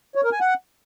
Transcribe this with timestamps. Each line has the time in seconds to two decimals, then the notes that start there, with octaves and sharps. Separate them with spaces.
0.15 C#5
0.24 A#4
0.32 G#5
0.40 F#5